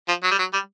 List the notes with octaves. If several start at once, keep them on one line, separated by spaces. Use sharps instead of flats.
F3
F#3
G3
F#3
G3